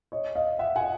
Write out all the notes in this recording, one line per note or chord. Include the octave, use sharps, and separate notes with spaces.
C#5 D#5
D#5 F5
E5 F#5
F#5 G#5